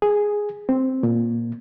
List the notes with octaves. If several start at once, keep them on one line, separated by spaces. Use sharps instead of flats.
G#4
C4
A#2